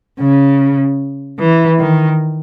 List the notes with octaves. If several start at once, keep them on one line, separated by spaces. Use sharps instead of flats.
C#3
E3
D#3